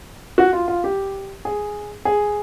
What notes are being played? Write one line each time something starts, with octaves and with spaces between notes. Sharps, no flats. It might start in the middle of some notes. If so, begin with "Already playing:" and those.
F#4
F4
F4
G4
G#4
G#4